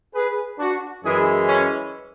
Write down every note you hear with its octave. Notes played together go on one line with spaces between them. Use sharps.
G#4 B4
D4 F#4
F#2 E3 G#3 E4 G#4
C#4